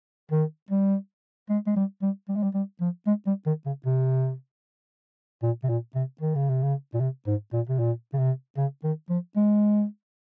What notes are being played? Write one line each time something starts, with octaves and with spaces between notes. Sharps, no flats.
D#3
G3
G#3
G#3
G3
G3
G3
G#3
G3
G3
F3
G#3
G3
D#3
C#3
C3
A#2
C3
A#2
C3
D#3
C#3
C3
C#3
A#2
C3
G#2
A#2
C3
A#2
C#3
C3
C#3
D#3
F3
G#3